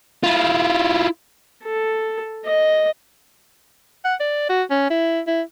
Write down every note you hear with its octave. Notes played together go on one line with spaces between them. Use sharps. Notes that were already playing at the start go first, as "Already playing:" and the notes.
E4 F4
A4
D#5
F#5
D5
F#4
C#4
E4
E4